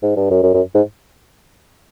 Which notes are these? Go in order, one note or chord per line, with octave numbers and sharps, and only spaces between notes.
G#2
G2
F#2
F#2
F#2
G#2